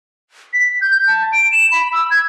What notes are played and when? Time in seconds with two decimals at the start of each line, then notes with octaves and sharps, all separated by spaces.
0.53 B6
0.81 G6
0.96 G6
1.07 A5
1.33 D7
1.52 E7
1.72 B5
1.93 E6
2.11 G#6